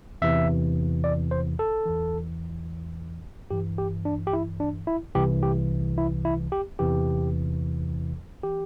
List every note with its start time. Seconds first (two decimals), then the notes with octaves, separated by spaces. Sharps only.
0.22 E2 C3 E3 E5
1.04 D5
1.31 C5
1.59 A4
1.86 E2 E3
3.51 G2 E3 G4
3.78 G4
4.05 D4
4.27 G4
4.33 E4
4.60 D4
4.87 E4
5.15 C2 C3 E3 G4
5.43 G4
5.98 E4
6.25 E4
6.52 G4
6.79 E2 C3 E3 G4
8.43 E3 G4